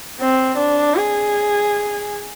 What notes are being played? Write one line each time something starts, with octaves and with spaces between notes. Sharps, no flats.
C4
D4
G#4